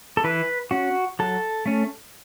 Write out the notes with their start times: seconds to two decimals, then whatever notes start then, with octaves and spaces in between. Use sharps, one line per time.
0.17 A4
0.24 E3 B4
0.71 C#4 F#4
1.19 F#3 A4
1.66 A3 C#4